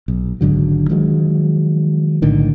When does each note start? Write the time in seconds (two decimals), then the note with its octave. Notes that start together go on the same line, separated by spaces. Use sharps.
0.08 B1
0.41 G#1 G#2 D3 F#3
0.90 D#3 F3 F#3 G#3
2.22 B1 A2 D3 D#3